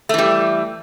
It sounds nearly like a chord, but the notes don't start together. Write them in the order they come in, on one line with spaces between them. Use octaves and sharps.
A3 E3 G3